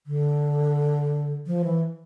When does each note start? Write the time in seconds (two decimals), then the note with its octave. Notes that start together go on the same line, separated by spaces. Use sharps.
0.07 D3
1.46 F3
1.64 E3